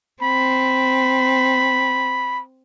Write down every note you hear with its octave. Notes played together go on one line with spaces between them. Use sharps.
C4 B5